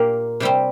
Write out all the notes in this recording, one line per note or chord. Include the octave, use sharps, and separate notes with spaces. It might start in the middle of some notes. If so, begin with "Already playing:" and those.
Already playing: A#2 A#3 G4 A#4
C3 G3 C4 G4